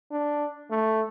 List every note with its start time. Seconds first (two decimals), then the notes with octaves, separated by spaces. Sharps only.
0.11 D4
0.71 A3